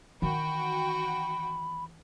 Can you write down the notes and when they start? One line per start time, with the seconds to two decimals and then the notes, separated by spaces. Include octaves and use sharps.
0.22 D#3 E3 F#4 G5 B5